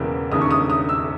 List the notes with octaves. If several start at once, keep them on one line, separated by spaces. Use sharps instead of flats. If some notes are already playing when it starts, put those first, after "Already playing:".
Already playing: E1 E2 C#3 E3 A#3
E1 D#2 C#3 D#6
C#6
D#6
D#6
E6